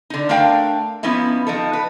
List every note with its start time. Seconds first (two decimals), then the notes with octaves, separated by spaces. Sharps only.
0.10 D3 D#4
0.29 A3 D4 A#4 F5 G5
1.03 F3 B3 C#4 D#4 E4
1.47 F3 D#4 A4
1.73 B4